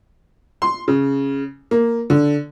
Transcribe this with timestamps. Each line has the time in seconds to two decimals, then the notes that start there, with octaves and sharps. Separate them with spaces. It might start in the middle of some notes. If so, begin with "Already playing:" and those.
0.62 C6
0.88 C#3
1.71 A#3
2.10 D3